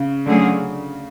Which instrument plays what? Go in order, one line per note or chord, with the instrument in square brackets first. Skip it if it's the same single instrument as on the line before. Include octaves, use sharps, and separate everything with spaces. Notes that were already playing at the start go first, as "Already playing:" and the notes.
Already playing: [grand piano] C#3
[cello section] D3 F#3 A3 C#4 G#4